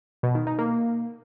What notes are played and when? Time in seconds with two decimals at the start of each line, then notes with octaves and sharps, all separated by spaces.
0.23 B2
0.35 D#3
0.47 D#4
0.59 A#3